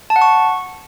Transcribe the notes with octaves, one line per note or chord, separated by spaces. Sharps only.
A5
F#5
C#6